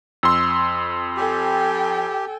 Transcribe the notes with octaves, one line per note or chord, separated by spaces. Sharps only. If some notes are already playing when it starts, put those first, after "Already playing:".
F2 C6 E6
G4 A4 G5 G#5